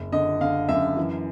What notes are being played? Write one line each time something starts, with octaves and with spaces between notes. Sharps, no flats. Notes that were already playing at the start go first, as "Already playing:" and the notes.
Already playing: F#1
D3 D#5
D3 F5
F#2 E5
E3